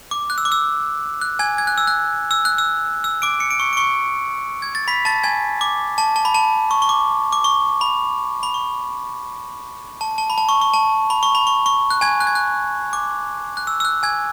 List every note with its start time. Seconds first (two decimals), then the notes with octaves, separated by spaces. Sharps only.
0.11 D6
0.30 F#6
0.38 E6
0.45 D6
0.52 E6
1.21 F#6
1.39 G#5 G#6
1.58 G#6
1.67 F#6
1.78 E6
1.87 F#6
2.31 E6
2.45 F#6
2.58 E6
3.04 E6
3.22 D6 D7
3.40 C#7
3.51 D7
3.60 C#6 C#7
3.73 D7
3.77 C#6 C#7
4.62 G#6
4.75 A6
4.88 B5 B6
5.05 A5 A6
5.23 G#5 G#6
5.61 D6
5.98 A5
6.16 A5
6.25 B5
6.34 A5
6.71 C#6
6.82 C#6
6.89 D6
7.32 D6
7.44 C#6
7.81 B5
8.43 B5
8.54 C#6
10.01 A5
10.18 A5
10.30 B5
10.38 A5
10.49 C#6
10.61 C#6
10.74 A5
11.10 B5
11.23 C#6
11.35 B5
11.47 C#6
11.66 C#6
11.90 F#6
12.01 G#5 G#6
12.20 F#6
12.27 G#6
12.35 F#6
12.93 D6
13.57 F#6
13.67 E6
13.80 E6
13.85 F#6
14.03 G#5 G#6